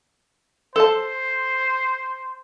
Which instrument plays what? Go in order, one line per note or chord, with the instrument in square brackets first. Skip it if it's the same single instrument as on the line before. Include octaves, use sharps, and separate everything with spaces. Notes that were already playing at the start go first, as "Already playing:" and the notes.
[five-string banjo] A4 A5 [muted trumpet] C5